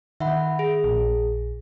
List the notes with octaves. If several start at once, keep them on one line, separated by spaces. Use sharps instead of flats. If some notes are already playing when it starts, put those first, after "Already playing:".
D#3 E5 F#5 B5
G#4
A#1